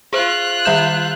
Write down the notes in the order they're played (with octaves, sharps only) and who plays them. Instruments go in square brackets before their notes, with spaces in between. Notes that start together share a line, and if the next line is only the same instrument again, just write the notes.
[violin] F4 F#6 [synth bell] G#4 C5
[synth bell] D#3 G3 G6 [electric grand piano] E5 E7